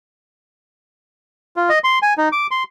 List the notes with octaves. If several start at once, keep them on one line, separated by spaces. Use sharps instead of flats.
F4
D#5
C6
G#5
D#4
D6
C6